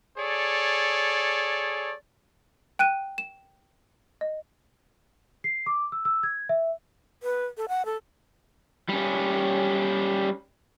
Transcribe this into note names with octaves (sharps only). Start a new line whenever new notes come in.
G#4 A4 C#5 D5
G5 F#6 D#7
E7
D#5
C7
D6
E6
E6
G#6
E5
B4
A4
F#5
A4
G3 C#4